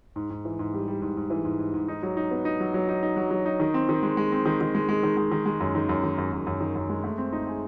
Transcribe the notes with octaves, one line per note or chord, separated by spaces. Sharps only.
G#2
G#2
E3
G#2
G3
G3
G#2
G#2
E3
G#2
G#2
G#2
D#4
F#3
D#4
B3
D#4
F#3
F#3
D#4
D#4
F#3
F#3
D#4
D#3
C4
D#3
G#3
G#3
C4
D#3
D#3
G#3
G#3
D#3
G#3
D#3
G#3
F#2
D#3
F#2
D#3
F#2
F#2
F#2
D#3
F#2
G#3
A3
C4
D#4
G#4